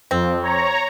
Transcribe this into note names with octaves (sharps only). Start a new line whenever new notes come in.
F2 C4
C#5 A#5